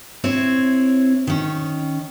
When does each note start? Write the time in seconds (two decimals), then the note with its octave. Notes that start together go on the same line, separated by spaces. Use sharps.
0.24 C4 E4 C#5
1.27 D#3 C#4